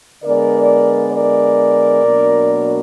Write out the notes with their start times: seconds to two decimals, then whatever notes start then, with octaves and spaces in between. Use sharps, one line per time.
0.24 D3 G#3 B3 A#4 D5
1.13 A#4 D5
2.03 B2 F#3 A#3 D4